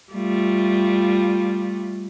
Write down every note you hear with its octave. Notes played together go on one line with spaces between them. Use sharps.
G3 A3 F4